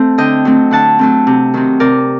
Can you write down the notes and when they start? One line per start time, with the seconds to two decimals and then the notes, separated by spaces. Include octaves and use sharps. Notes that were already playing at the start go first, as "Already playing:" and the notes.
Already playing: A3 C4 A4 C5
0.18 D3 D#5 G5
0.45 F#3 A3 C4
0.71 D3 F#5 A5
0.99 F#3 A3 C4
1.27 C3
1.54 D#3 F#3 C4
1.80 C3 A#4 D5